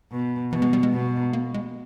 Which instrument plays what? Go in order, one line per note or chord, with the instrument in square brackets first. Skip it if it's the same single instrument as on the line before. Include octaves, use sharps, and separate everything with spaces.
[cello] B2
[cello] B2 [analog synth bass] E3
[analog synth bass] G#3
G3
G#3
[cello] B2
[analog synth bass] A#3
G#3